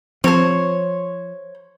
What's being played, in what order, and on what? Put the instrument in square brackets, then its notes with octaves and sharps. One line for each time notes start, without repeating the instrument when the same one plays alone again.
[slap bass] F3 [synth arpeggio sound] C4 A4 [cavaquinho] C5 C#5